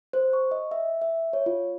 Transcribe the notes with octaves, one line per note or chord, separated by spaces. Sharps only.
C5
C#6
D#5
E5
E5
C#5
F4